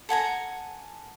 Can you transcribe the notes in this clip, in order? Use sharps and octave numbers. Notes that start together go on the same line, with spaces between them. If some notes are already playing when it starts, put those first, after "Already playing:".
A4 F#5 G#5 A#5